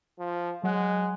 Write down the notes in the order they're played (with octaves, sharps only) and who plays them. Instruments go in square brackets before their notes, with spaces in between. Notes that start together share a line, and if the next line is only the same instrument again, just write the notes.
[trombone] F3
[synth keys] F#3 F#5 F#6 [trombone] G#3